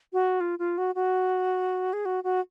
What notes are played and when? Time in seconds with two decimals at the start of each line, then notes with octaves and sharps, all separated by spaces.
0.13 F#4
0.41 F4
0.59 F4
0.78 F#4
0.95 F#4
1.93 G#4
2.05 F#4
2.24 F#4